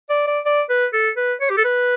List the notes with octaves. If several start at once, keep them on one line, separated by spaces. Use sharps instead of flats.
D5
D5
D5
B4
A4
B4
C#5
G4
A4
B4